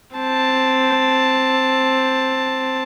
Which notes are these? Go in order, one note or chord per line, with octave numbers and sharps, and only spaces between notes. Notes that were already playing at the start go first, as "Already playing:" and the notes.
C4 A5